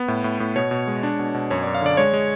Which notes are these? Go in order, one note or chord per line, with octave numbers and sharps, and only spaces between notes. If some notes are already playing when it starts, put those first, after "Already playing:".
Already playing: B3
A2
A2
A2
B2 C#5
B2
G#3
D4
B2
B2
F#2 C#5
F#2 D5
F5
D3 D5
G#3 C#5
G#3